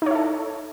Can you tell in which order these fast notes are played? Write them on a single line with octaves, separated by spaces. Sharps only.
D#4 C#5 E4 A4